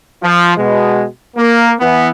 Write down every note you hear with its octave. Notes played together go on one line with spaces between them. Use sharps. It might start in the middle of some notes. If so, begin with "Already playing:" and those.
F3
B2 G#3
A#3
E3 B3